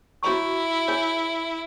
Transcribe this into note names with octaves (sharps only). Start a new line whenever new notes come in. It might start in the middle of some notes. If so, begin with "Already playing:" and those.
E4 F#4 C#5 E5 A#5 C#6
G#4 C#5 G#5